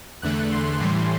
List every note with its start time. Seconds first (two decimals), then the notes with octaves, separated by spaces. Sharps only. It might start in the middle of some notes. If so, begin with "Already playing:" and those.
0.22 E2 D3 A3 F#6
0.52 C6
0.80 A2 E3 G3